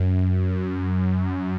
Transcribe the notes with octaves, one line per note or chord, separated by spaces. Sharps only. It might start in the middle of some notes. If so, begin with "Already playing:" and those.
Already playing: F#2